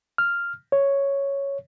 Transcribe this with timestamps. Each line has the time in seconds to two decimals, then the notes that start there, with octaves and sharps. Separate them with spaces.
0.18 F6
0.72 C#5